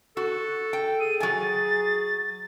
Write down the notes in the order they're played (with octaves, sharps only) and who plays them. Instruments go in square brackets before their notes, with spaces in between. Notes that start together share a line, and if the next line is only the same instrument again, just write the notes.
[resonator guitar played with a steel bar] F#4 [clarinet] A4
[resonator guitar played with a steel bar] G5
[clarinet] G#4 [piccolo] D#7
[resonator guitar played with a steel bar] F#3 G#5 [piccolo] A6